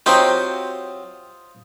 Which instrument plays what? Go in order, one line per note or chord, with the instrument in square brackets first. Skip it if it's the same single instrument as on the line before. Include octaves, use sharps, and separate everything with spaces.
[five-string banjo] F#3 C4 G4 [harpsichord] F4 C5 D#5